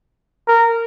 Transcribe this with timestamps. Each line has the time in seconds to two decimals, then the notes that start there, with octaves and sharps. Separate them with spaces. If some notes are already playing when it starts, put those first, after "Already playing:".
0.48 A#4